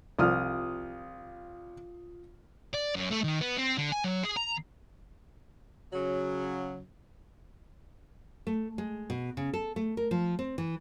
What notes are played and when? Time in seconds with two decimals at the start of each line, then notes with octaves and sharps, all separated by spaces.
0.19 C2 C3 F3 F4 D#6 F6
2.74 D5
2.95 F#2
3.11 A3
3.24 D#3
3.41 B3
3.58 C4
3.78 D3
3.92 G#5
4.04 F#3
4.23 G#4
4.37 A#5
5.93 C#3 F#3
8.47 A3
8.78 G#3
9.10 B2
9.37 C#3
9.54 A4
9.76 A3
9.97 A#4
10.11 F3
10.39 C4
10.58 E3